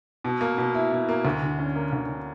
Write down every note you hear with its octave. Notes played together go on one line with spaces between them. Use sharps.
B2
A#3
B2
E4
B2
A#3
D2
D3
C#4
A#3
D2
D3